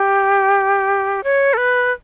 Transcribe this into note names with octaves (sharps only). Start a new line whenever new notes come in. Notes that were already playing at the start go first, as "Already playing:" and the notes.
Already playing: G4
C#5
A4
B4